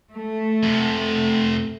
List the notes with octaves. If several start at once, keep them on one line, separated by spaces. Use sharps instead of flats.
A3
F2 C3